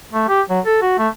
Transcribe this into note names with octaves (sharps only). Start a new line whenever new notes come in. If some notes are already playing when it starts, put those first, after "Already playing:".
A3
G4
F#3
A4
F#4
A3